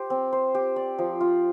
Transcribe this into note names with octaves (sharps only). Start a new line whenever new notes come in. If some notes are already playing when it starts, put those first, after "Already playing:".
Already playing: G4 C5
C4
C5
G4
D5
F3
F4